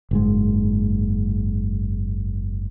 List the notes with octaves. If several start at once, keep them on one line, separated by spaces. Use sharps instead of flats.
F#1 G#2 G#3